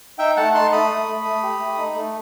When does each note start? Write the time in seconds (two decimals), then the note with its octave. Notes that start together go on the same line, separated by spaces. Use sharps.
0.19 D#4 E5 G5
0.36 A3 F#5 A5
0.54 D#4 A5 C6
0.72 A3 B5 D#6
0.90 A3
1.07 A3
1.25 A3
1.43 G4
1.60 A3
1.78 D#4
1.95 A3